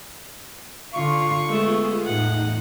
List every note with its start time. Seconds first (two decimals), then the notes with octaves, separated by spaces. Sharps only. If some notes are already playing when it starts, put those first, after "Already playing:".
0.94 D3 F4 C#6
1.48 G#3 A3 B3 F4 G#4 A4
2.06 E2 A2 D#4 F#5 F#6